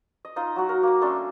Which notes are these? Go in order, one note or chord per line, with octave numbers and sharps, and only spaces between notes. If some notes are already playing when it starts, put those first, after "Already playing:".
D#5
D#4 F4 D#5
F#3 F#4
A#4
A#3 D6
A3 C#4 D4 C6